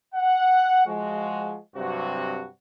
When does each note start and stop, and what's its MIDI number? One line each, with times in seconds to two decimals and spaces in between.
0.15 0.83 78
0.86 1.57 53
0.86 1.57 56
0.86 1.57 66
1.76 2.46 43
1.76 2.46 48
1.76 2.46 54
1.76 2.46 60
1.76 2.46 66